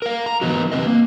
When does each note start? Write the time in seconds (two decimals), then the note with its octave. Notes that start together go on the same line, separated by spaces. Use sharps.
0.02 A#4 F5
0.26 A#5
0.41 E3 F#3 B3 D#4 F#4
0.72 C4 B4 D#5
0.87 A#3